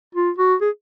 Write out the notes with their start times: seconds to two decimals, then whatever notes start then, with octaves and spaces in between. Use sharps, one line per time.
0.14 F4
0.38 F#4
0.61 G#4